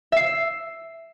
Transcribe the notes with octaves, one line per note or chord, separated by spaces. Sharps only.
E5 C7